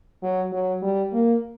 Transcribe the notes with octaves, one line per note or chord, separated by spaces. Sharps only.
F#3
F#3
G3
A#3